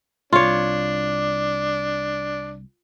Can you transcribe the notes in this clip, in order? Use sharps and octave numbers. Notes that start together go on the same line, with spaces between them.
C2 D4 F4 C#5